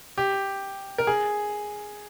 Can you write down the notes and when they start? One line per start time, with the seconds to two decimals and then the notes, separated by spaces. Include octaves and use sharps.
0.18 G4
0.98 A#4
1.07 G#4